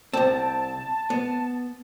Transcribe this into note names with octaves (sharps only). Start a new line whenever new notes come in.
C2 C4 A5
B3